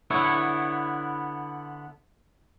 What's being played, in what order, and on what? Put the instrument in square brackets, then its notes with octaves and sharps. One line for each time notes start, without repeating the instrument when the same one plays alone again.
[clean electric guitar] D3 B3 E4 C#5